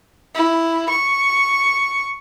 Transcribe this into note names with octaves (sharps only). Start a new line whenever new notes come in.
E4
C#6